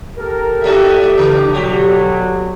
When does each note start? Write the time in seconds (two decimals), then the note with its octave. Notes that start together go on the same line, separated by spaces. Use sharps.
0.16 G4 A4 A#4
0.64 A3 D#4 F#4 G4 A4 D5 E5
1.17 C#3 E3 D4
1.53 B2 D3 F#3 G3 G4